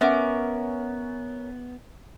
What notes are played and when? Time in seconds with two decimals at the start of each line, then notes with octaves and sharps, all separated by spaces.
0.01 B3 C#4 A#4 E5 F#5 D6